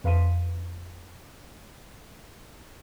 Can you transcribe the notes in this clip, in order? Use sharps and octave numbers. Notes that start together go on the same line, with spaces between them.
F2 B4 F5 C6 B6 D#7